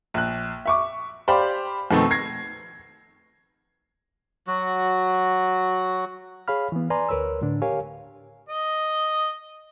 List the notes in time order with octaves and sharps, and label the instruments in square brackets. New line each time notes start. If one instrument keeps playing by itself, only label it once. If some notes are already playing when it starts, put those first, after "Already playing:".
[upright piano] A#1 F#6
E5 C#6 D6
G4 C5 D5 F5 B5
F2 B2 D#3 A3 C4 D#4
G#6 A#6 C7
[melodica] F#3 F#4
[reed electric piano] G#4 C#5 F5 B5 F6
E3 B3
B4 D5 G#5 A#5 C6
D2 A#4 B4 C#5 E6
A2 D3 D4
G4 A#4 C#5 F5 G#5
[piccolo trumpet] D#5